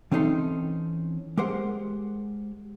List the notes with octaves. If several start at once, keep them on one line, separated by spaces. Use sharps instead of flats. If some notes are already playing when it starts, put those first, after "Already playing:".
E3 C4 C#4 D#4 A4 C6
G#3 G4 A#4 C5 F#5